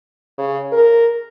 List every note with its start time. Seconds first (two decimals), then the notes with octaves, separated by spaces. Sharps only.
0.38 C#3
0.72 A#4